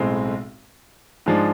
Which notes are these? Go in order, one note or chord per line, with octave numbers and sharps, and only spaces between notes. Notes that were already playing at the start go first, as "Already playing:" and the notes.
Already playing: B1 A2 G#3 C4
G#2 F3 G#3 D4